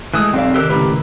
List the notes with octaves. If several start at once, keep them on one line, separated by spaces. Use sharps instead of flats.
E3 G#3 A3 D#6 F#6
B1 C4 G4 A4 C#5 D5 F5
C3 D#3 G4 A#4 C5 E6 F#6
A2 C#3 A#3 C#4 G4 B4